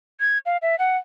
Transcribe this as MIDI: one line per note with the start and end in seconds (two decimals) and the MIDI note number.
0.20 0.38 92
0.46 0.57 77
0.62 0.75 76
0.79 0.97 78